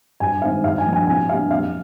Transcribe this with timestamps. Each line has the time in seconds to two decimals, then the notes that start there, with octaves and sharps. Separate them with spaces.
0.20 G2 G#5
0.42 D#3 G#3 C4 D#4 F5
0.64 G2 F5
0.78 G#5
0.85 F3 A#3 D4
0.93 G#5
1.07 C2 G#5
1.29 A#2 G3 D4 F5
1.50 F2 F5